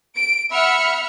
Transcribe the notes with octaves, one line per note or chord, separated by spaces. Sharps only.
D7
E5 F#5 B5 F6 C#7